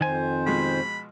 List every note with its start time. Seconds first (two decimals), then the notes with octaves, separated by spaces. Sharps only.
0.01 F2 D#3 C5 G#5
0.46 B2 F3 G#3 B5